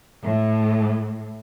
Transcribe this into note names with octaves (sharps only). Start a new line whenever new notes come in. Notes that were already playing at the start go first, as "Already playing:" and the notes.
A2